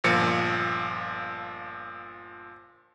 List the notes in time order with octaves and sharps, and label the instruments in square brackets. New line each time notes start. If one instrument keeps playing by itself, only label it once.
[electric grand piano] G1 A#2 F3 C#7